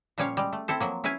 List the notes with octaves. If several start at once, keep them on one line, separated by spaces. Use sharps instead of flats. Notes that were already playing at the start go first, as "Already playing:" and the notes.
A#2 F3 G3 C#4 C#5 F5
G3 G#3
A3
C4 E4 A4 C5
F3 F#3 A#3
C#4 E4 B4 F5 G#5